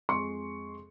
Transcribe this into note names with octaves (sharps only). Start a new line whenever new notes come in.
F2 G#3 G#4 C6 C#6 C#7